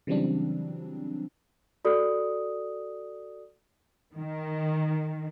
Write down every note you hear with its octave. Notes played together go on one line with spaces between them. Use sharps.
C#3 E3 F#3 G3 C4 D4
F#4 A4 D5 D#6
D#3